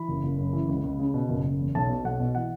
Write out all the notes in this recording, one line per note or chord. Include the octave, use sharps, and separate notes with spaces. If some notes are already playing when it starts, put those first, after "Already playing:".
Already playing: E3 B5
F#1
F#1
F#2
E3
C#2
C#2
C#3
B2
F#1
F#1
E2
B1 A5
B2
B1 F#5
B2
E3 F#5